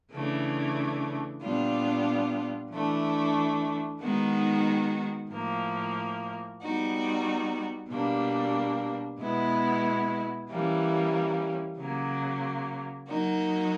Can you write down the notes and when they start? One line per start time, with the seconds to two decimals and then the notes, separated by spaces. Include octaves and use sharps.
0.12 C#3 E3 A3 D4
1.42 A#2 G3 B3 D4 F4
2.72 E3 A3 D4
4.01 D#3 G#3 B3 D#4 F#4
5.31 A2 F3 A#3
6.61 G3 B3 D#4 F#4
7.90 B2 G3 A#3 D4
9.20 B2 G#3 B3 E4
10.50 E3 G3 A#3 C#4
11.78 C#3 F#3 A#3
13.08 F#3 A#3 D#4 F#4